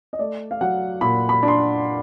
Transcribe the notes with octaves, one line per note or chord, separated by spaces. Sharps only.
D#5
A3 D5
F5
F#3 F#5
A#2 B5
B5
D4
C6